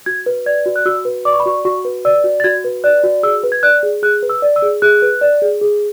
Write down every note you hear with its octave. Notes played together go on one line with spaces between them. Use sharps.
F#4 G#6
B4
D5 G#6
F#4
F#6
F#4 E6
B4
D5 D6
C#6
B5
F#4 C#6
F#4 C#6
B4
D5 E6
F#4
A6
F#4 G#6
B4
D5 F#6
F#4
G#4 E6
B4
G#6
D5 F#6
G#4
G#4 F#6
B4
E6
D5
E6
G#4
G#4 F#6
B4
D5
G#4
G#4